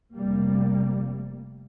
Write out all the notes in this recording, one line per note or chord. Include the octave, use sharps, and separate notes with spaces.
F1 F2 C3 G3 A#3